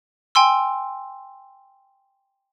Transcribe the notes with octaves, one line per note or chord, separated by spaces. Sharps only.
G5 G#5 C6 E6